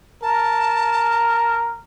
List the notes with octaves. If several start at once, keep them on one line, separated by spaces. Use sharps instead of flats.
A#4 A5